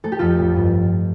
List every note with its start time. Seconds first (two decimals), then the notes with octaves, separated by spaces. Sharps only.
0.04 A3 A4
0.12 G4
0.19 F2 F4 A4
0.39 A1
0.56 G2